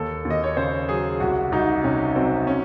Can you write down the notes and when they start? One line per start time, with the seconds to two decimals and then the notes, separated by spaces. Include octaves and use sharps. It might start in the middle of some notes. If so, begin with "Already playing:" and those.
Already playing: D#2 A4
0.25 D#2
0.30 D#5
0.44 C#5
0.57 C#3 C5
0.89 F#3 G#4
1.20 C2 F#4
1.52 C2 D#4
1.84 C3 C#4
2.16 F#3 C4
2.47 C#4